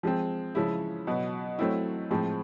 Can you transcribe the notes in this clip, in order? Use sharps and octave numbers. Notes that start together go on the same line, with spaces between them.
F3 G#3 C4
C#3 F3 G#3 C#4 E4
B2 F#3 B3
F#3 A3 C4 E4
A2 F3 G#3 C4